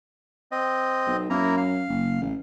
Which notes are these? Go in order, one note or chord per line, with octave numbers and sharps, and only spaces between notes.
C4 D#5
B1
F#2 A#3 E4 A#5
F5
F#1
A1